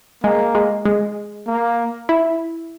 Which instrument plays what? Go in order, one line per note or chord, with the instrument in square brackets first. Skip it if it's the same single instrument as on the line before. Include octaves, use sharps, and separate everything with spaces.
[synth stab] G#3 [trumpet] A#3
[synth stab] G#3
G#3
[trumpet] A#3
[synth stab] E4